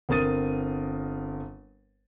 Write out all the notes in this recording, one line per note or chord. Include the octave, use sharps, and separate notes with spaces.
G1 C4 A#4 D#6 A6 D#7